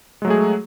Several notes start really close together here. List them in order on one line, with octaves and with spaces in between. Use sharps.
G#3 F#3 A3 G#4